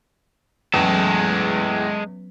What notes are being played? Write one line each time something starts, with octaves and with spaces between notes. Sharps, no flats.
E2 A2 F#3 G#3 B3 C#4 A4